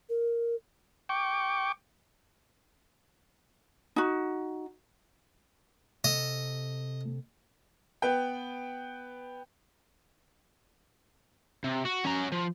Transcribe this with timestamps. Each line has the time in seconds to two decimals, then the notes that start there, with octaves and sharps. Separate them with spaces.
0.09 A#4
1.09 G5 C#6 D6
3.96 D#4 F#4
6.04 C3 A4 D#5
8.02 B3 B4 G5
11.64 C3
11.85 F#4
12.05 C#4 A#5
12.32 F3